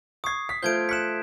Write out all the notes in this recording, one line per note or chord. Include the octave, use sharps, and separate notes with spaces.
C#6 D#6 G#6 C7
B6
A3 F4 C5 G6 G#6 D7
F#6 B6 C#7 E7